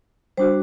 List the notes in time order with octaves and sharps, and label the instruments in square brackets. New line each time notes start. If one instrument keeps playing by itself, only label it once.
[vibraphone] G3 D4 F#4 C5